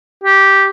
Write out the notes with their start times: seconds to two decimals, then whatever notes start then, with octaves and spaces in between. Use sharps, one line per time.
0.24 G4